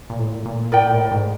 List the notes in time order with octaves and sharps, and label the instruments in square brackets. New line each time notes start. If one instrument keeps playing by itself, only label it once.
[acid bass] A#2
A2
A#2
[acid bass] A2 [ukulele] A#4 D5 G5
[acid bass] A#2
A2
G#2